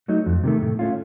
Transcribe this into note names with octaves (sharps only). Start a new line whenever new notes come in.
F#3 A3 D#4
F2
C3 D#3 A3
A2
A3 C#4 F4